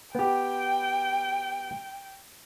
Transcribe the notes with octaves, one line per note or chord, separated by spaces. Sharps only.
B3 G4 G5